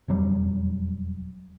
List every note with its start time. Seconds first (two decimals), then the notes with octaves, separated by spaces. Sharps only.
0.08 E1 F2 F#3 G3